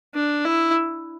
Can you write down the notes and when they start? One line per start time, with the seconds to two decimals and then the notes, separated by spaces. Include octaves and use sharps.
0.15 D4
0.45 E4